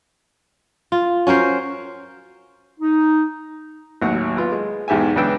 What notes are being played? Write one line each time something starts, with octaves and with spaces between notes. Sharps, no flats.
F4
C#4 F#4 A#4 C5
D#4
A1 D#2 F#3 F#5
B3 F4
G#3
B1 E2 G#2 G4 E5 G#5
C#2 E3 B3 D4 G5 E6